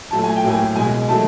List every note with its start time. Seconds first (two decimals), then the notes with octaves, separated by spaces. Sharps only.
0.11 A#2 F#3 A3 A5
0.24 G#5
0.36 G5
0.44 A2 F#3 A#3 G#5
0.76 B2 G#3 G#5
1.09 D#3 F#3 A3 A5